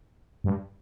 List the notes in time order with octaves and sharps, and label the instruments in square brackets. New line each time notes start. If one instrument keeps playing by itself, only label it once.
[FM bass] G2